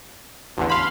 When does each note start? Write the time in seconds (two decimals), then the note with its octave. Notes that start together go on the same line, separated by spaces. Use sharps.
0.57 A1 E2 D3
0.69 F5 B5 C6